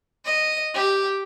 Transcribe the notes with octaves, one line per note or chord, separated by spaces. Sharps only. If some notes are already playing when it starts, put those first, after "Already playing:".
D#5
G4